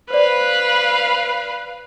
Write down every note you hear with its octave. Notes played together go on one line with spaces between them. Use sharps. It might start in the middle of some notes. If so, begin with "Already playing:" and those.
B4 C5 D5 F5